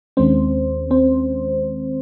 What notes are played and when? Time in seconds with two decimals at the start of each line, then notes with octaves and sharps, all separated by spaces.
0.17 D#2 D#3 G#3 C4 C#4 C5
0.91 C4 C5